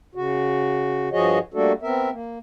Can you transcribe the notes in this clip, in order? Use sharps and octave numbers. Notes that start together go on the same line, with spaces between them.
C#3 F#4
G2 F3 F#4 G#4 C#5 D#5
G3 A3 A#3 D4 F#4 A4
B3 C4 A#4 E5
A#3